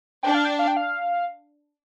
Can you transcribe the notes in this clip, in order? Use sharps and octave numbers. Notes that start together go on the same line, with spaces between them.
D4 G5
F5
G5
F5
G5
F5